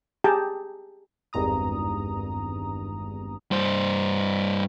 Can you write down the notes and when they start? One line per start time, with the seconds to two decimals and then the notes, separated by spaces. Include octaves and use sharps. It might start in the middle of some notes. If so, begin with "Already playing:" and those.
0.24 G4 G#4 G5 A5 A#5
1.33 G#1 E2 G2 A#5 D#6
3.51 G2 C5